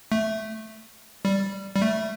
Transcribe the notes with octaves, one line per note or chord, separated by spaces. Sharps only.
A3
G3
G3
A3